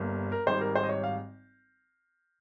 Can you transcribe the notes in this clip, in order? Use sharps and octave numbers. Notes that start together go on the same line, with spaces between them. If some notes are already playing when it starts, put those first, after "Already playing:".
Already playing: G1 G2 G3 A#3
A#4
G#1 G#2 G3 C5
A#4
C5
D#5
C#5
F5